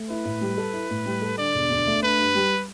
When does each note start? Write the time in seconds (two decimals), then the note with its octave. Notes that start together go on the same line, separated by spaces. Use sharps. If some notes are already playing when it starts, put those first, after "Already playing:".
Already playing: A3
0.09 E4 B4
0.25 A2
0.41 G3
0.57 A4
0.73 E4
0.90 A2
1.06 G3
1.22 A4
1.38 D3 D5
1.54 E1
1.70 D2
1.87 A3
2.03 D4 B4
2.19 G2
2.35 G3